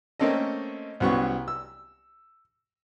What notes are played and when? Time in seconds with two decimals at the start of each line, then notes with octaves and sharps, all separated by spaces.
0.20 A3 A#3 C4 C#4 A4 D#5
1.00 C2 F#3 B3 C#4 C#6
1.48 E6